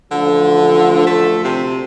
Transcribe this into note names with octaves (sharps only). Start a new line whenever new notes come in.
A1 D2 D3 F3
A3
C3